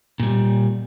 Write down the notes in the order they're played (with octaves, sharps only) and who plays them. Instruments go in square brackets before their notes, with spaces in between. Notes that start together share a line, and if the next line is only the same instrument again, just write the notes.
[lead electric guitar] A#2 G3